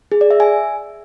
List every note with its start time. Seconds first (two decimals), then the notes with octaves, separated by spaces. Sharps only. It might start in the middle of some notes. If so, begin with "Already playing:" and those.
0.12 G#4
0.21 D5
0.31 E5
0.40 G#5